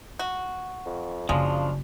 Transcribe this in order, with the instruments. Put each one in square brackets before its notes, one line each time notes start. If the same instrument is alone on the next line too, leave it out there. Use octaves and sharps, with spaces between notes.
[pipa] F#4
[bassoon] F2
[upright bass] F#1 [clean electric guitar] C#3 F3 [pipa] G#3 [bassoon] D4